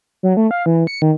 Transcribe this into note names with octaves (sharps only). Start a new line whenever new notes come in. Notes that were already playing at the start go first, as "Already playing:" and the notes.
F#3
A3
F5
E3
C#7
D#3